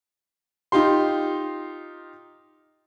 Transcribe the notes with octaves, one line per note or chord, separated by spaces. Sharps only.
D#4 F4 G4 C6